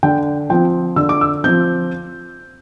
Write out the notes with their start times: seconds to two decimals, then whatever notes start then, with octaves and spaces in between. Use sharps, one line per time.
0.03 D3 G5
0.50 F3 C4 G5
0.96 D3 E6
1.09 D6
1.21 E6
1.44 F3 C4 G6